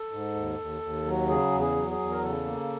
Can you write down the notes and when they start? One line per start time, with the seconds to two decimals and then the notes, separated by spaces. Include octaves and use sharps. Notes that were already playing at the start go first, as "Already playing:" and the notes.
Already playing: A4
0.11 G#2
0.35 D#2
0.58 D#2
0.82 D#2
1.06 F#3
1.28 C#3 G#4
1.52 E2
1.61 G#4
1.76 F#3
1.91 G#4
1.99 E2
2.11 A#4
2.23 C#3 A4
2.46 A#3